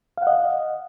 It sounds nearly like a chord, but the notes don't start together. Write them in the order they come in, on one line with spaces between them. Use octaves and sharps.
F5 F#5 D#5